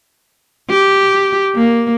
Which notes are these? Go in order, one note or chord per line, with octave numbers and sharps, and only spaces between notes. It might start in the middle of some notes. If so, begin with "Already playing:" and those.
G4
A#3